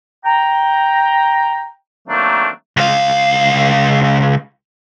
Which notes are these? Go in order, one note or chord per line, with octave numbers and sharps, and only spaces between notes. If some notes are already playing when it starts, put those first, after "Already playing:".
G5 A#5
D#3 F#3 A3 A#3 C4 D4
C#2 F5